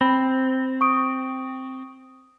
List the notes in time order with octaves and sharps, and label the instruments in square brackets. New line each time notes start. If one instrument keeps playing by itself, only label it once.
[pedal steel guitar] C4 [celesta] B5
[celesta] C#6 D#6 D7